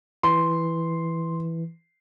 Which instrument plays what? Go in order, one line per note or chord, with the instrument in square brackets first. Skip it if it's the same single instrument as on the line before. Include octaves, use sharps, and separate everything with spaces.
[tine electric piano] E3 [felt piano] C6